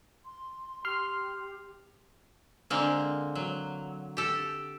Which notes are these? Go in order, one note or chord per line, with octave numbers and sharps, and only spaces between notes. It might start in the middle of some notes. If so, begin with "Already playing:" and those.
C6
G4 C6 F6
D3 G#3 A#3 C4
F#3
G4 A4